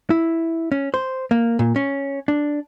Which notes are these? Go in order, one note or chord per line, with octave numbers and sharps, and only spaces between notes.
E4
C#4
C5
A#3
A#2
C#4
D4